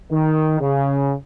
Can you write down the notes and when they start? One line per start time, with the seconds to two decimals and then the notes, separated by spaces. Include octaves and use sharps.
0.11 D#3
0.61 C#3